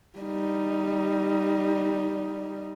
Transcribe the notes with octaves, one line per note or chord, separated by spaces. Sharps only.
G3 D#4